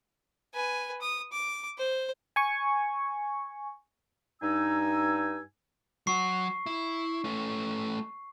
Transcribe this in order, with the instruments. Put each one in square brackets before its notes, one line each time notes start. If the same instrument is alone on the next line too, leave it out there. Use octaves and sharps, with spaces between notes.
[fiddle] B4 G#5
D#6
D6
C5
[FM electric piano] G#5 C#6
[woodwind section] G2 D#4 G#5 E6
[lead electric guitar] F#3 F#4 [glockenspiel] C#6 C7
[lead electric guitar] E4
A3 C#4